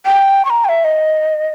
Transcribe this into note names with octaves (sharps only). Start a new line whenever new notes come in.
G5
C#6
A#5
G5
E5
D#5